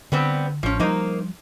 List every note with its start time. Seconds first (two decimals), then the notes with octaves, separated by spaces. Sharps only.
0.12 D3 G3 B3 C4
0.63 A1 F3 C#4
0.80 F3 G3 A#3 D#4 C5